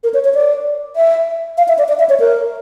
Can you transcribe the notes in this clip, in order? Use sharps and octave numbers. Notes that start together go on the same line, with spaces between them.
A#4
C#5
C#5
D5
E5
F5
E5
D5
D5
E5
C#5
A#4